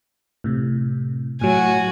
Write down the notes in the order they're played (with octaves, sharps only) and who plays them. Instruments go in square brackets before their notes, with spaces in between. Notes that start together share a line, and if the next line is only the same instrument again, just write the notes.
[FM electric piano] A2 C3
[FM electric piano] A2 F#3 [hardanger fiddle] F#4 G#5